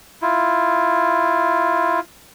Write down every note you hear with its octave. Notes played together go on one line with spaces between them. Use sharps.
E4 F4